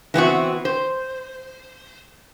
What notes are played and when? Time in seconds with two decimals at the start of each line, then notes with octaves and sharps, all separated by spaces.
0.14 E3 B3 C4 F#4
0.65 C5